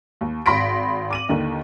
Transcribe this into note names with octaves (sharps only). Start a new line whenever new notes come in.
D#2
G#1 B5 C6 A#6 B6 D7
D6 D#7 F#7
D#2 D3 D#3 D4